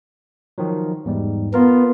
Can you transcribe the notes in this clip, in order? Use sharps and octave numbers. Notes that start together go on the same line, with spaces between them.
D#3 F3 F#3
E2 G#2 G3
B3 F4 A#4